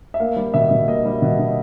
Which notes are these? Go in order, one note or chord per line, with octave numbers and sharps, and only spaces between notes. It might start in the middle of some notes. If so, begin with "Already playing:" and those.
E5
A#3 F5
G3
B2 E5
B2
A#3 D#5
G3
B2
B2